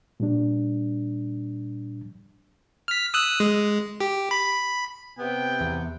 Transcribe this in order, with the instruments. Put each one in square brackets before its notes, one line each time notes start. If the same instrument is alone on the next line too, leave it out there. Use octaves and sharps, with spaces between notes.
[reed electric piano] A#2 G3 D4
[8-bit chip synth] F6 B6
D#6 E6 F#6
G#3
G4
B5
[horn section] C3 B3 [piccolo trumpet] G5
[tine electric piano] E2